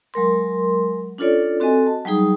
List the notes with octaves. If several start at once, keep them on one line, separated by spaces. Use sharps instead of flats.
F#3 G#3 A#4 C6
C#4 D4 F4 A4 C#5 D5
C4 F#4 A4 D#5 G#5
A5
F#3 G3 D#4 G#4 D#6